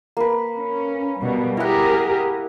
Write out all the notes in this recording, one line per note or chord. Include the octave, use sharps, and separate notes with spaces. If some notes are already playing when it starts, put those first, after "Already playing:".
A#3 B4
C#4
B2 G3
E4 G4 G#4 A#4 F#5